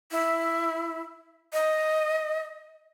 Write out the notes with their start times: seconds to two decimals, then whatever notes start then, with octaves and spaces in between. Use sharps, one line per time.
0.11 E4
1.53 D#5